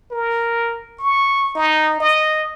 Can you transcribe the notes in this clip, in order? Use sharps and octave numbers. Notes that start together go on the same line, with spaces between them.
A#4
C#6
D#4
D#5